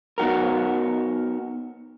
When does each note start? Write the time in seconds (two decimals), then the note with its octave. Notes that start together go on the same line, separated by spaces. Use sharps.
0.18 B3 D#4 F#4 A#4